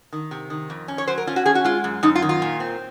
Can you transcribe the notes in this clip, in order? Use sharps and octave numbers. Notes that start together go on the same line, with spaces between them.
D#3
C3
D#3
F2
C#4
C#5
F#3 C5
A#4
C#4 F4
F#4
C#4 G#4
F#4
G#3 F4
F#2
F#2 D#4
F4
D#3
F4
A#2
C4